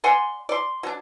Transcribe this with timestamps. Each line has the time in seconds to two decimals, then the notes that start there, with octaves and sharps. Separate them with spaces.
0.04 D5 F#5 G#5 C6
0.49 D5 C6
0.83 F#3 D4